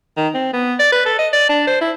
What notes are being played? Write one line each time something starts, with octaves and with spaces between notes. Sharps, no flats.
D#3
C4
B3
D5
B4
A4
D#5
D5
D4
C5
E4